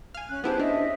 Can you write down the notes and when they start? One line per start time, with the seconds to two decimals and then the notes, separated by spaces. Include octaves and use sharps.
0.15 F5 G#5
0.28 C#4 F#6
0.44 B3 E4 G4 G#4 C5 A5
0.59 C#4 D4 D#5 E5